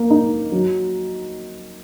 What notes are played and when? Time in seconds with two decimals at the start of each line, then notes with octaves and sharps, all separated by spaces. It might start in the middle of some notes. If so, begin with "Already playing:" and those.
Already playing: A#3
0.10 D#4
0.52 F#3